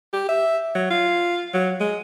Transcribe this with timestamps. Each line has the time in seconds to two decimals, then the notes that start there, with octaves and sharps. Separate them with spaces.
0.13 G4
0.28 E5
0.75 F#3
0.90 F4
1.53 F#3
1.80 G#3